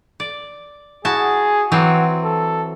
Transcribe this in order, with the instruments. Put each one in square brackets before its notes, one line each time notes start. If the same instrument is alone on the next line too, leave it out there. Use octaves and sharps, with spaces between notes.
[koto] D5
[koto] E4 F#4 A5 [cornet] G#4
[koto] E3 F#3 C4 [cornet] F#4
[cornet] A4